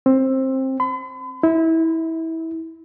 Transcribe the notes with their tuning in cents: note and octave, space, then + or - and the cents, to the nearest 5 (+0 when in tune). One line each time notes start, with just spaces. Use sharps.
C4 +20
B5 +45
E4 -25